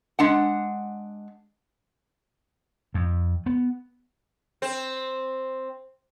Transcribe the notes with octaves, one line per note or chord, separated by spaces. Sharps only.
G#3 D4 F#5
F2
B3
C4 C5